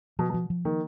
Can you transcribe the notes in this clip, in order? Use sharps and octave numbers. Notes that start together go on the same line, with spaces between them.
B2 F3
B2
F3
F3
D#3 A#3